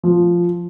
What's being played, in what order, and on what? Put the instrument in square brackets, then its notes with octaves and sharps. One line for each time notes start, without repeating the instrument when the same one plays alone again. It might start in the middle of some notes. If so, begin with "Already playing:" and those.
[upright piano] F3